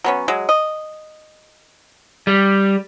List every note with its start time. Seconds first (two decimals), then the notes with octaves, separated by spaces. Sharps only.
0.04 F#3 B3 C#4
0.28 F#3 G#3
0.49 D#5
2.27 G3